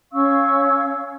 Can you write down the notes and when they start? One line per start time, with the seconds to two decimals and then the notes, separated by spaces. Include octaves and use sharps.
0.13 C#4 F5 C#6 E6